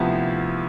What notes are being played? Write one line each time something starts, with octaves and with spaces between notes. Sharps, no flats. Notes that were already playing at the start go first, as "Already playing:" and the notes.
Already playing: D2 C3 F3 B3 E4